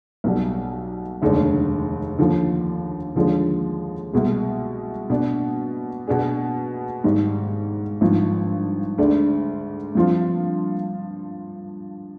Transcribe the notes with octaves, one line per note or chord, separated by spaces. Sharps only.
B1 B2 G3
F1 D#2 D3 G#3 D4
D#2 D3 F3
D#2 D3 F3 G#3 D4
C2 B2 G#3
B2 B3 D4
B2 B3 D4 G#4
G#1 G#2 G3
G#1 G2 F3
D2 D3 G#3 D4
G2 F3 C4 F4